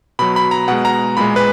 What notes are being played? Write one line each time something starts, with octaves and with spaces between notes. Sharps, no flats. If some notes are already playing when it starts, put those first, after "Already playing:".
B2 F#3 B5
B5
A#5
B2 G#3 F#5
A#5
A#2 G#3 B5
B4